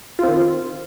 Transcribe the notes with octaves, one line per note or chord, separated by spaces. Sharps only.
D#3 C4 F4